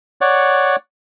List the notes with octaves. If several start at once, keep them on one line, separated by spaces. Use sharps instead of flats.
C#5 D5 F#5